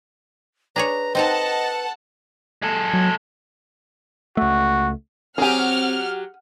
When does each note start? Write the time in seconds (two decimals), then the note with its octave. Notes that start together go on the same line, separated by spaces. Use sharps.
0.76 D4 G#4 B4 C#5 A#5
1.15 C4 D#4 A4 D#5 F#5 A5 A#5
2.62 G#3 A4
2.94 F#3
4.37 C#2 A3 F#4
5.38 F#3 C4 G4 G#4 F#5 G#5 F6